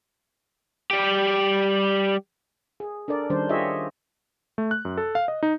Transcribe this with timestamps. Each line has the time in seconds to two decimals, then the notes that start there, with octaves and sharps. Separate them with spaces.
0.91 G3 G4
2.80 G#4
3.08 D4 A4 A#4 D5
3.30 D#3 G3 C#4 D4 C5
3.49 F4 G4 G#4 C#5 D#5 E5
4.58 A3
4.71 F#6
4.85 F#2
4.98 A4
5.15 F5
5.28 D#5
5.43 D#4